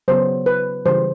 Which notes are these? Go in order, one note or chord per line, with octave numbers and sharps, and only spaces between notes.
C#3 F#3 B3 C5
B4
C#3 E3 G3 C5